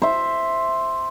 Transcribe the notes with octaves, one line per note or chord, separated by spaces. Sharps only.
C5 E5